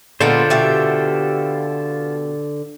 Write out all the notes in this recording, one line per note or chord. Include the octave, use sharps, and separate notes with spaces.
A#2 D3 G#3 B3 F4 A4 C5
B2 G4 E5